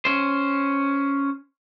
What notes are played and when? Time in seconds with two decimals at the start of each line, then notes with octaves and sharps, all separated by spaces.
0.05 C#4 C5